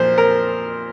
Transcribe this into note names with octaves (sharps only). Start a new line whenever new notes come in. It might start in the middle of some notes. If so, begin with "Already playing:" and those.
Already playing: A#2 F3 C5
A#4